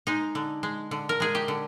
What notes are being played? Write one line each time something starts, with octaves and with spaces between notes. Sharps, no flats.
G#3 D#4
D3
G#3
D3
A#4
G#3 G#4
G4
D3